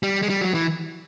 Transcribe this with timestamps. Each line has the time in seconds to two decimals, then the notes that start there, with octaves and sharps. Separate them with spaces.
0.03 G3
0.22 G#3
0.29 G3
0.41 F#3
0.54 E3